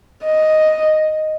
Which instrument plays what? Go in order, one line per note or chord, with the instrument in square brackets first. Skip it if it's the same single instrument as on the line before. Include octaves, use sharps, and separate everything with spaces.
[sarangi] D#5